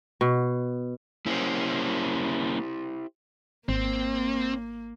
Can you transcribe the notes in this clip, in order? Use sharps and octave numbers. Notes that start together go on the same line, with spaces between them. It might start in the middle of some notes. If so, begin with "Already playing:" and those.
B2
A#3 C#4 E4 G4 C5
G#1 A#3 C4